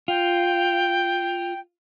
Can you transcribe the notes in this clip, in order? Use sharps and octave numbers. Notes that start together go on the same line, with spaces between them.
F4 G5